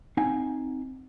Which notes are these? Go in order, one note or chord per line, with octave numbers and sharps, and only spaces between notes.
C4 D#4 F5 F#5 G#5